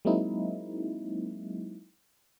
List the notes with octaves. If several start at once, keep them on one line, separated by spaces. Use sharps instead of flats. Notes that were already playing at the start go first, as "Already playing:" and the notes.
F#3 G#3 A#3 C4 D#4 E4